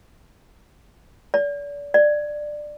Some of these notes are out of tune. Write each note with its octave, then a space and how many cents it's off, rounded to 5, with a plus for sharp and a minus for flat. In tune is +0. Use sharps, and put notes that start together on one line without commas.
D5 -35
D5 +15